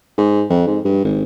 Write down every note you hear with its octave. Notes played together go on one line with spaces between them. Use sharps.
G#2
F2
G#2
G2
G#1